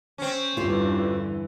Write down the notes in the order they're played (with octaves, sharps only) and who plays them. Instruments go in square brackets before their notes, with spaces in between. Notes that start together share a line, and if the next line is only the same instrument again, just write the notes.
[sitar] C4 C#4
[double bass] E2 G2 [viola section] D3 E3 [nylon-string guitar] F4 G4